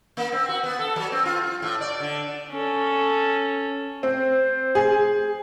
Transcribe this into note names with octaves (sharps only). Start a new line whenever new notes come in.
A#3
C4
F#4
B3
A4
F#3
C4
F4
F4
A2
D5
D3
C#4 A4
C4 C5
G#4